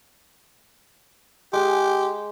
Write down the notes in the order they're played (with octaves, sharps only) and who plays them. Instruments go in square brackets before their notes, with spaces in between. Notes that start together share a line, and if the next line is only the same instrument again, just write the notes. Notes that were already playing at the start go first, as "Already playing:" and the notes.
[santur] G#3 G#4 [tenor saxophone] G4